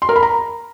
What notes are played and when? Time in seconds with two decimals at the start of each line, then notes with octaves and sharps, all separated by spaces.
0.02 C6
0.09 A#4
0.16 B5
0.23 A#5